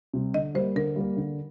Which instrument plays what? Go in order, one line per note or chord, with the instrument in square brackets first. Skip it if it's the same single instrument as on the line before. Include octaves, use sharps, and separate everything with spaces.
[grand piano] C3 G3
[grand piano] D3 [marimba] D#5
[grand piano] G3 A#3 [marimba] C5
[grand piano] D3 [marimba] A#4
[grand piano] G3 A#3
D3